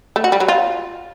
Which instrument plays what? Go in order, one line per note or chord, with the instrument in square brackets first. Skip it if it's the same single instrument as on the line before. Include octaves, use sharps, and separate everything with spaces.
[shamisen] A3
F#4
G3
F#3
F4